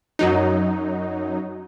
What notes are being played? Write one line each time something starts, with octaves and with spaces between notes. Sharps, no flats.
F#2 F#3 D#4